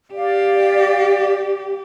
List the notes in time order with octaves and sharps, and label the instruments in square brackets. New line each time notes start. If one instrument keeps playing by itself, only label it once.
[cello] G4 [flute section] D5 F5